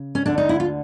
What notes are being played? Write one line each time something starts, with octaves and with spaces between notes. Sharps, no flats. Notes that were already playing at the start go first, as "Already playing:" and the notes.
Already playing: C#3
C#4
D2 D3 D4
D#4
E4
F4